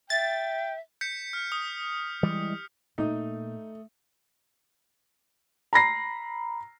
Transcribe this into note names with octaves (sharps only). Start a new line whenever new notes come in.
E5 G5 A6
G6 B6 C#7
F6
D#6
E3 G3 G#3
A#2 A3 D#4 D#6
A#5 B5 A#6 C7